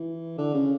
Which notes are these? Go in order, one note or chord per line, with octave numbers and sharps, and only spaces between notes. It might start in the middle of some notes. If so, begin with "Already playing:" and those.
Already playing: E3
D3
C#3